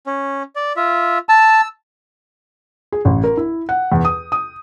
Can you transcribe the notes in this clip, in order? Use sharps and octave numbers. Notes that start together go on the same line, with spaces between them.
C#4
D5
F4 E5
A5 E6
G#4
A1
A#4
E4
F#5
E2
D#6
D#6